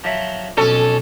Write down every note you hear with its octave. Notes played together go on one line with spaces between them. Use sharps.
F3 F#3 E5
B1 F2 C#4 A4